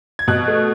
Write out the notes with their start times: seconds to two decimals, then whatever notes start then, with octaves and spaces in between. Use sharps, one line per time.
0.19 G#6
0.28 B2 F#6
0.48 A3